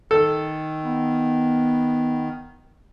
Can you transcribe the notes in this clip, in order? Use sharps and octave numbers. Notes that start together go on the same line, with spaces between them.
D#3 A4
B3